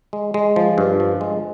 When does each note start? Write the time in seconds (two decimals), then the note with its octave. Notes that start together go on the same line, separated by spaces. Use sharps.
0.13 G#3
0.34 G#3
0.56 F3
0.78 G2
1.00 F3
1.21 G#3